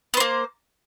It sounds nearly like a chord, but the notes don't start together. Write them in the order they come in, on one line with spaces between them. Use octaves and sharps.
B3 C5 A#3